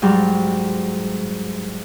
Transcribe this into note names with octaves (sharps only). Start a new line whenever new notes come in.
G#2 F#3 G3